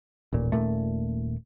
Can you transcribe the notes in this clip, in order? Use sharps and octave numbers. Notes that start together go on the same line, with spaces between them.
D#1 A1 A#2
D#1 D#2 A#2 A3